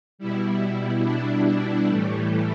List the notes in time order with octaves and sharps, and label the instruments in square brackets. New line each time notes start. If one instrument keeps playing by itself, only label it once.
[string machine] B2 G3 E4
D4
A2 E3 G3 A3